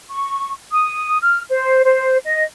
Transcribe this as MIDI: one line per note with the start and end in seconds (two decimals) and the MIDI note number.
0.11 0.51 85
0.71 1.18 87
1.22 1.41 89
1.49 1.82 72
1.84 2.17 72
2.25 2.43 75